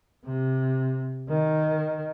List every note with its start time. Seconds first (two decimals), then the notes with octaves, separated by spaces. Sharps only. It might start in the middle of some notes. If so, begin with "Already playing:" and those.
0.25 C3
1.29 D#3